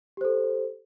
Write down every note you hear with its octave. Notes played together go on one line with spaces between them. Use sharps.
G4 A4 C5